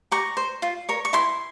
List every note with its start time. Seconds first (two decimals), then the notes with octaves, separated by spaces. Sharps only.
0.11 G4 A#5 C#6
0.37 C5
0.62 F4
0.89 A#4 C#5
1.05 C#6
1.13 E4 G#5 C6